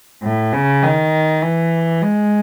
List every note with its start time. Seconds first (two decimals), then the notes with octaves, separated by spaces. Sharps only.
0.23 A2
0.53 C#3
0.83 D#3
1.42 E3
2.02 G#3